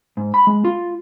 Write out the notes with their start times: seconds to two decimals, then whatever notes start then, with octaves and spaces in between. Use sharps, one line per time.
0.17 G#2
0.34 B5
0.47 G#3
0.65 F4